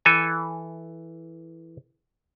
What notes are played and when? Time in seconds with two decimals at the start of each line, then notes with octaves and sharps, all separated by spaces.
0.05 E3 A4 G#5